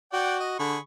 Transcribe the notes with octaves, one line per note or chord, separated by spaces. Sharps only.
F#4 D5 F#5 G5
D#5
D3 G#4 B5 C#6